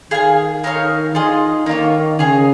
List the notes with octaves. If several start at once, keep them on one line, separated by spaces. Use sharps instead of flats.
D#3 G#4 F5 G#5
D#4 A#4 C#5 F5
D#4 F4 G#4 D#5
D#3 A#3 F4 C#5
C#3 G#4 F5 G#5